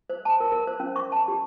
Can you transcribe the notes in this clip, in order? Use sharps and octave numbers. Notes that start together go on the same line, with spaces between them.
C5
A5
A#4
A#4
C5
C#4
C#6
A5
G4